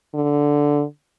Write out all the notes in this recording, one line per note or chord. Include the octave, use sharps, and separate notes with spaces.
D3